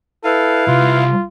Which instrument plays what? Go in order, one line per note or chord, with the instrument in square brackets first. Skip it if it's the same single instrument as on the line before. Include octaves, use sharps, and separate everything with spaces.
[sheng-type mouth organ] E4 F5 [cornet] A4 [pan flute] B4
[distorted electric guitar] C2 [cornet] F4